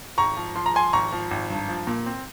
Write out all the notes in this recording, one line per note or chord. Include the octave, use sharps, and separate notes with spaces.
G#1 A#5 C#6
F3
F3 C6
A#5
F3 G#5 C6
G#1 A#5 C#6
F3
G#1
G2
F3
A#2
C4